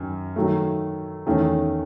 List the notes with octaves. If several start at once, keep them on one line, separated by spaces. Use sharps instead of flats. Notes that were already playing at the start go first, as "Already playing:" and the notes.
Already playing: F#2 D#3
D#3 F#3 A3
E2 D#3 A3 C#4